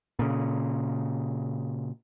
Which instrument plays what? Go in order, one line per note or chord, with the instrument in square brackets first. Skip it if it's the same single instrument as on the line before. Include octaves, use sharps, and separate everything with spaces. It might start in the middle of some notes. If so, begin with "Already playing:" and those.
[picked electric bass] A#2 C#3